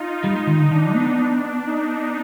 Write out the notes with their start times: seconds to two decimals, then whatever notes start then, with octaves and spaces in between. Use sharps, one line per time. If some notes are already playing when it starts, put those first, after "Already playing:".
Already playing: D#4 F4
0.24 G3 D#4
0.35 G#3
0.47 D#3
0.59 D3
0.71 D#3 D4
0.94 B3
1.17 D4
1.64 D#4